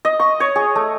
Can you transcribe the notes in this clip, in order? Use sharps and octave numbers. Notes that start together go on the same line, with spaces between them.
D#5
C#6
C#5
G#4
A3